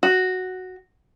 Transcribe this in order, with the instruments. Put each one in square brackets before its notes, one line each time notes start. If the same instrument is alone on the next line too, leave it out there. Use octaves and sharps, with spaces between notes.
[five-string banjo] F#4